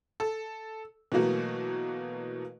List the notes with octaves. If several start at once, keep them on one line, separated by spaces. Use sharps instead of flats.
A4
B2 E3 F#3 A3 A#3 F#4